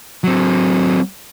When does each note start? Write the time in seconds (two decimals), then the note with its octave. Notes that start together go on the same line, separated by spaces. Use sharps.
0.24 F#3 C4